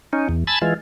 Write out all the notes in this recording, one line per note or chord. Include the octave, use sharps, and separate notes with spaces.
C#4 D#4
E2
G#5 A5 B5 E6 A6
E3 G#3 F4